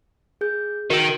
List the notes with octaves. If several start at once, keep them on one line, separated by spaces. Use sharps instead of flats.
G#4 G6
D#3 F#4 E6